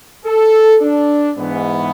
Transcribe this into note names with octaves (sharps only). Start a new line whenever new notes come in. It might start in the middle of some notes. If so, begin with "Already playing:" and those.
A4
D4
G#2 E3 B3